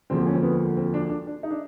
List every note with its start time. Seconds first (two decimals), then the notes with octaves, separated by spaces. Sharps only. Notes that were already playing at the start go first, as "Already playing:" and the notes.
0.10 E1 D2 D3 F3 A#3 C4
0.27 C#4
0.34 C4
0.43 B3
0.77 C4
0.94 D4
1.10 D4
1.27 D4
1.43 D#4
1.51 D4